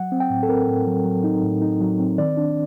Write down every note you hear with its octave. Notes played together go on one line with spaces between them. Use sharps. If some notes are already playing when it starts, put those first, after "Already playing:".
Already playing: F#3 F#5
C4
G5
A2
A4
C4 A#4
A2
F#3
F#3
D#4
A2
D#4
F#3
C4
D#3 D5
D4